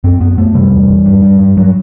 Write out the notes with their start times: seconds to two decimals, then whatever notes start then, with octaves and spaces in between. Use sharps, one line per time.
0.04 F#2 C4
0.20 F#2 B3
0.38 F#2 A3
0.55 C3 G3
0.71 E2
0.89 E2
1.05 G2
1.22 G2
1.39 G2
1.57 G2 F#3